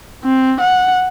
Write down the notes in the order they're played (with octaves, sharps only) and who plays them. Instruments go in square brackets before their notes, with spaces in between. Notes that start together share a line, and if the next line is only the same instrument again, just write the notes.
[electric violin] C4
F#5